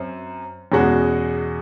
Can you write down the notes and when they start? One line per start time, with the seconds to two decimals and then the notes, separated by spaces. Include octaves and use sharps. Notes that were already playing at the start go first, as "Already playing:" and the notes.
Already playing: F#2 C4
0.72 E2 B2 G#3 C#4 F#4